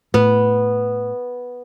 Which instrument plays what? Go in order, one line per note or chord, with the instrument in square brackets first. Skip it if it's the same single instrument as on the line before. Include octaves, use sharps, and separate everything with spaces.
[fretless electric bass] A2 [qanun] B3